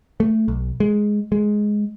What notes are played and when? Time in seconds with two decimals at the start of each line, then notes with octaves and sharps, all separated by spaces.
0.20 A3
0.48 B1
0.80 G#3
1.32 G#3